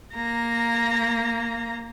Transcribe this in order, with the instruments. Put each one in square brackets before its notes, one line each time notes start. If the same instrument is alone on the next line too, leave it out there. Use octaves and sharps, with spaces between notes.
[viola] A#3 A#5